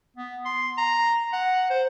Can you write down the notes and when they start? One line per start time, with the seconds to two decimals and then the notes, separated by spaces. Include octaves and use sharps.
0.17 B3
0.45 C6
0.78 A#5
1.33 F#5
1.70 C5